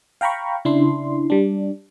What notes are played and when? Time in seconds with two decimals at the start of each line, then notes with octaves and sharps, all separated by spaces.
0.21 F5 G5 A#5 B5 C#6
0.65 C#3 D4 E4 C6
1.30 G3 D4